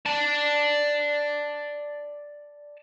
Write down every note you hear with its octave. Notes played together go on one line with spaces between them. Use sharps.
D5 A5